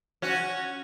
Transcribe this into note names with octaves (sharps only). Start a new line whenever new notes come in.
C#4 F#4